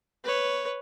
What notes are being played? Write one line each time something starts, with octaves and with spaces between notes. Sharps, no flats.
B4 C#5